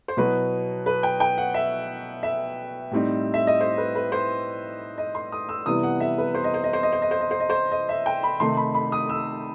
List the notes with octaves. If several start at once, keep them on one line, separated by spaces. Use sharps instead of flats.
C5
B2 F#3 B3 E4 B4
B4
G5
G5
F#5
E5
E5
A2 G3 C4 D#4
E5
D#5
C5
B4
B4
C5
D#5
C6
D#6
E6
C3 E3 G3 B3 E4 D#6
F#5
E5
B4
C5
D#5
C5
D#5
C5
D#5
C5
D#5
C5
D#5
C5
D#5
C5
D#5
E5
G5
B5
C3 D#3 A3 D#4 C6
B5
B5
D#6
E6